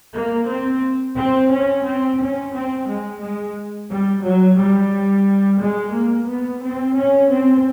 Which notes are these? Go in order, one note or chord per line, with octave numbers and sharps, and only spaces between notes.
A#3
C4
C4
C#4
C4
C#4
C4
G#3
G#3
G3
F#3
G3
G#3
A#3
B3
C4
C#4
C4